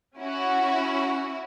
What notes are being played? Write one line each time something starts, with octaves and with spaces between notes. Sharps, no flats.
C#4 E4 F#4